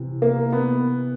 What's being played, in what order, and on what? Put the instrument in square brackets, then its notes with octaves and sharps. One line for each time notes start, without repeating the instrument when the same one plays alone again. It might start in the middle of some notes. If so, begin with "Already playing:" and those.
Already playing: [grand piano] C3 E3
A#3
B3